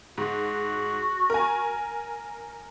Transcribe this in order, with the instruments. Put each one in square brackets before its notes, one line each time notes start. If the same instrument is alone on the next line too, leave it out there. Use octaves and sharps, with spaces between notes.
[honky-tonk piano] G#2 [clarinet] F#4
[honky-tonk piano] A#4 G#5